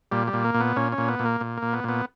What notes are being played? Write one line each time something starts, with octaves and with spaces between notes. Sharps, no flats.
A#2 G3
G3
A#2
A#3
A#2
B3
A#2 C#4
C#4
A#2
B3
A#2
A#3
A#2
A#2 A#3
B3
A#2 B3